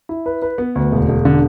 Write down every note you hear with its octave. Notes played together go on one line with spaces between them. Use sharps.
E4
B4
B4
B3
D2
E1
E1
D3